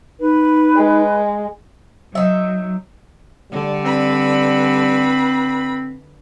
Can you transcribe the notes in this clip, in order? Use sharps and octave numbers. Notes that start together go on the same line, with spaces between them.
D#4 B4
G#3
F#3 D#4 E5
D3 G3
C4 B4 B5